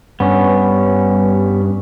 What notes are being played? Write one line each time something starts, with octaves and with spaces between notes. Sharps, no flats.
G2 B3 C#4